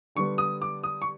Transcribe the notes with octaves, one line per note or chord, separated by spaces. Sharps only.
D3 G3 B3 C#6
D#6
D6
D#6
C#6